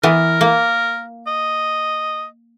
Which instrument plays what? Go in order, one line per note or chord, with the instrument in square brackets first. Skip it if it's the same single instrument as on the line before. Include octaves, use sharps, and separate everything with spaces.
[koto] E3 B3 [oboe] A#4
[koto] A#3
[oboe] D#5